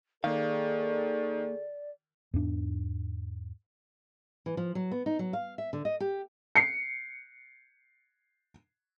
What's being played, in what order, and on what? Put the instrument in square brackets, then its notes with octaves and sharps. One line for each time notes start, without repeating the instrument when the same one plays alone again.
[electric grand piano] D#3 [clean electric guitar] A#3 F5 [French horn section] G#4 A4 [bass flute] D5
[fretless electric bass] E2 G#2 D4
[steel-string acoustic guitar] E3
F3
F#3
B3
D#4
F#3
F5
E5
D3
D#5
G4
[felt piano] C7 C#7